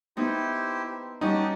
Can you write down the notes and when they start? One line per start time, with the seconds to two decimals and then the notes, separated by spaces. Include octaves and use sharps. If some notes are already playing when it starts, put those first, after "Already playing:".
0.17 B3 D#4 E4 G4 C5
1.21 G3 C#4 D#4 F#4 G4 A5 D#6